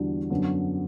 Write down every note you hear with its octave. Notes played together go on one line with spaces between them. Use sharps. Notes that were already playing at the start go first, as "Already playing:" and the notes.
Already playing: E2 D3 G3 D4 F#4
F#2 D3 F#3 B3